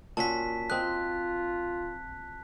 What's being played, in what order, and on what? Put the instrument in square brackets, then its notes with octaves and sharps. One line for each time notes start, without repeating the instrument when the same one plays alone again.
[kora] A#2 C#4 F#4 [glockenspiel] A5 B6
[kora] C4 D#5 [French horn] F4 [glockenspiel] F#6